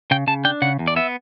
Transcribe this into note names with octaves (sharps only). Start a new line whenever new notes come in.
C#3 G5
C#3 A5
D4 G5
C#3 F#5
E2
D5
B3 E5